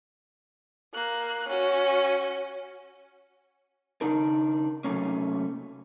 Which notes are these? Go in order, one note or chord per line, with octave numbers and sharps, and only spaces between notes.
A#3 F#6
C#4 F#4
C#3 D4 D#4 A#4
C3 F#3 A3 A#3 C#4